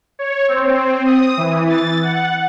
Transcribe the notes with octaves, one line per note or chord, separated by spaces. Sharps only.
C#5
C4
D#6
E3
A6
F#5